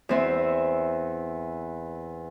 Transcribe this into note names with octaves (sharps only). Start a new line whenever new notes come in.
E2 C4 E5